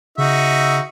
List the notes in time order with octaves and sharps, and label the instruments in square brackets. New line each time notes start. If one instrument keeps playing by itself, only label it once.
[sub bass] C#3 [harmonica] D#4 F#4 E5